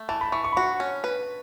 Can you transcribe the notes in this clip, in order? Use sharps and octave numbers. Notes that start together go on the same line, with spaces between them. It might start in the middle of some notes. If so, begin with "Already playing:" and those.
Already playing: A3
E3 A5
B5
E3 C#6
C#6
B5
F#4 C#6
C#4
B4